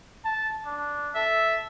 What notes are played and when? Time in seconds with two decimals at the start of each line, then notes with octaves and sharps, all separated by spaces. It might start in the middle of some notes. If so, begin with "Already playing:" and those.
0.25 A5
0.66 D4
1.15 A4 E5